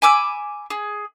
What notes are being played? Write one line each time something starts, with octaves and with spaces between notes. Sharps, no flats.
G#5 B5 D6 E6
G#4